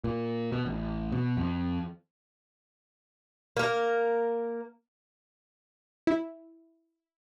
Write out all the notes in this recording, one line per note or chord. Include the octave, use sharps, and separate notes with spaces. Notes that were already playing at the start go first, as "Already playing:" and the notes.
A#2
B2
A1
B2
F2
A#3 A#4
E4